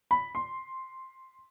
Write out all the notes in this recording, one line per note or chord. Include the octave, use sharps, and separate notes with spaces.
B5
C6